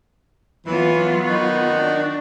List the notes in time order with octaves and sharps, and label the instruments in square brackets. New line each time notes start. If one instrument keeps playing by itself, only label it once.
[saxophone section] E3 [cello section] F#3 B3 F4
[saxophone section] D#3 D#4 F#4
[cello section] D4